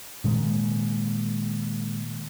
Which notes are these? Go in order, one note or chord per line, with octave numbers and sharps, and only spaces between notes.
A#2 D#3 G#3 A#3